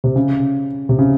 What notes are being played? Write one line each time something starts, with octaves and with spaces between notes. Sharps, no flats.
C3
C#3
C3
C#3